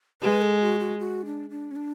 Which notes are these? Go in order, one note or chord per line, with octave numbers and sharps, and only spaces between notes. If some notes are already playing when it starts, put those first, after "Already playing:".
G#3 B4
A4
F#4
F#4
F#4
D4
D4
C#4
D4